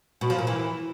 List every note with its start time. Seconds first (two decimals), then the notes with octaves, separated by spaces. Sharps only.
0.21 B2
0.30 F3
0.38 A#2
0.47 E3